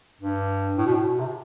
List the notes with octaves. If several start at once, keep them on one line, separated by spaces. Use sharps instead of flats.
G2
A2
B2
A2
B2
C3